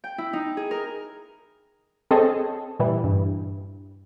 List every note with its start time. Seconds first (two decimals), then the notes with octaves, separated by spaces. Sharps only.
0.04 G5
0.18 E4
0.33 D#4
0.57 G#4
0.71 A#4
2.11 C4 G#4 A4 C#5 D#5 A5
2.79 A#2 E3 G3 E4
3.04 G2